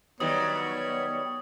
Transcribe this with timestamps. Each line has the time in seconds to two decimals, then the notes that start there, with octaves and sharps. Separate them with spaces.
0.20 D#3 F#3 G3 B3 C#5 D#6